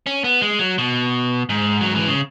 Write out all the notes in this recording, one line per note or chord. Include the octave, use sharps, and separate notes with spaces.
C#4
B3
G#3
F#3
B2
G#2
F#3
E3
C#3